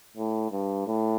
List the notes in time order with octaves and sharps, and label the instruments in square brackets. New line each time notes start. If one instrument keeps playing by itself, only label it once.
[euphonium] A2
G2
A2